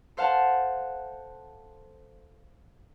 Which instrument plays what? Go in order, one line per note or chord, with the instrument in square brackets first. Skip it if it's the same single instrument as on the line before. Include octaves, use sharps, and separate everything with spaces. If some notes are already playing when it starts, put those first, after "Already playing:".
[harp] A4 C5 F5 F#5 A5